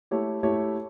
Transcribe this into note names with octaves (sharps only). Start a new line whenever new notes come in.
A3 E4 G4 C#5
A3 E4 G4 C#5